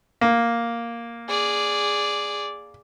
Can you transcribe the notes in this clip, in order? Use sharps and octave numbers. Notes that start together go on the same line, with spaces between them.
A#3
G#4 D5